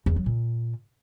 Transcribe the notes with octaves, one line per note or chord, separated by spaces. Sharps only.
E2
F#3
A#2